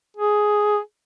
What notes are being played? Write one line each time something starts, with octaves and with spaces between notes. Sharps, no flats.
G#4